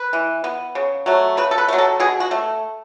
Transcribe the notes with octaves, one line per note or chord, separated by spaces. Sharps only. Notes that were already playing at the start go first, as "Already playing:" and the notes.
Already playing: B4
E3
B3
C#3
F#3 A3
C#3 B4
A4
B4
F#3 A3
A4
B2 G#4
F#4
A3